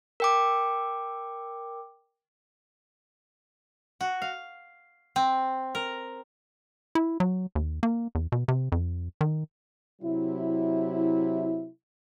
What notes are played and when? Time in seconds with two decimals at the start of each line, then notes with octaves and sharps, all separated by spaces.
0.20 A#4 G5 D6
4.01 F#4
4.22 F5
5.16 C4
5.75 A#4
6.95 E4
7.20 F#3
7.55 D#2
7.83 A#3
8.15 E2
8.32 B2
8.48 C3
8.72 F2
9.21 D#3
10.02 C3 F#3 E4